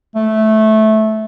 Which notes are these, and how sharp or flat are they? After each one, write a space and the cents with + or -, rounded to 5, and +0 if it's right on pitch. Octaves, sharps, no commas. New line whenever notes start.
A3 -15